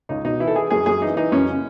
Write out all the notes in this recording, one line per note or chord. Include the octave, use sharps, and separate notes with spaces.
C#2 D#4
B2 D#4
E3 E4
A4
E3 G#4
F#2 G#4
F#2 G#4
E3 D#4
E3 D#4
F#2 C#4
C#3